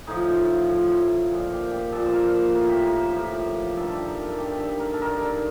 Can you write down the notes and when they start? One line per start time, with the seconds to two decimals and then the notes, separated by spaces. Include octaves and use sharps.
0.07 A2 F3 D#4
0.69 A2 F3
1.31 A#2 F3 F4
1.51 G4
1.71 G4
1.92 A#2 F3 A4
2.06 C5
2.13 A#4
2.34 C5
2.54 A2 F3 A#4
2.69 G4
2.85 A#4
3.01 C5
3.16 A2 F3 A#4
3.70 A#4
3.77 G2 D#3 A4
3.88 G4 A4
4.08 A#4
4.23 A4
4.38 G2 D#3 G4
4.51 G4
4.60 A4
4.79 A#4
4.94 A4
5.01 G2 D#3 A#4
5.21 A4